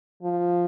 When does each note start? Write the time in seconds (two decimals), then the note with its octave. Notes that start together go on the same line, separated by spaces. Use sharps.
0.23 F3